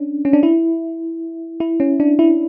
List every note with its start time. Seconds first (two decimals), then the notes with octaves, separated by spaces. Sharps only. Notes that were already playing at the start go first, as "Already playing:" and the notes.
Already playing: C#4 D4
0.25 C#4
0.33 D4
0.43 E4
1.60 E4
1.80 C#4
2.00 D4
2.19 E4